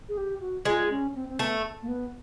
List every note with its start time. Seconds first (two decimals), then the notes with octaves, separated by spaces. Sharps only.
0.09 G#4
0.17 G4
0.41 F#4
0.65 G#3 F4
0.90 C#4
1.15 C4
1.29 C4
1.39 A3 B3
1.82 A#3
1.88 B3